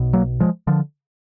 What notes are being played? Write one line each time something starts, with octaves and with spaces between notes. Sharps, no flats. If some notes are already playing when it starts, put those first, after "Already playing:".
Already playing: B1 B2
F#3 A#3
F3 G#3
D3 F3